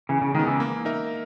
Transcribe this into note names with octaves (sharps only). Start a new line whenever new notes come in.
C#3 E3
C#3
D#3 G#3 B3
C#3 E3
A#3
D#4 A#4 E5